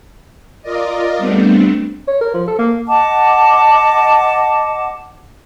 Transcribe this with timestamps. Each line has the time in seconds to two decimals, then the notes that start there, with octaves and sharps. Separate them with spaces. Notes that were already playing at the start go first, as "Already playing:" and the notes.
0.62 F4 A#4 D5 D#5
1.17 G3 A3 B3 C4 D4
2.08 C#5
2.21 A#4
2.34 F3
2.48 A4
2.59 A#3
2.87 D#5 F#5 A5 D6